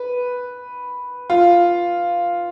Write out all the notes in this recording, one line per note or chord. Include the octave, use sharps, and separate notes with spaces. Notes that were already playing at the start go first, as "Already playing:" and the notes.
Already playing: B4
F4